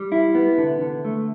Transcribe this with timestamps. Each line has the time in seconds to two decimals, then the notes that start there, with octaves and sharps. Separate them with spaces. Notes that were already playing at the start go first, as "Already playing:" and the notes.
Already playing: G3
0.12 E4
0.35 B3
0.58 D3
0.81 D3
1.05 A3